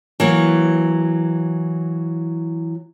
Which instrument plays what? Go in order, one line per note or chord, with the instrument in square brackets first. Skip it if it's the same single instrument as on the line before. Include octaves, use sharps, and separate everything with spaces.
[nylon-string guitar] E3 F#3 A#3